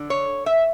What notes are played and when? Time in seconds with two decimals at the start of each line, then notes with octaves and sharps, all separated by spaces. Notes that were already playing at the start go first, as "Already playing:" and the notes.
Already playing: D3
0.10 C#5
0.46 E5